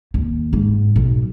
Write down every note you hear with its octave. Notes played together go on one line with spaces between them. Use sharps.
D#2
G#2
B1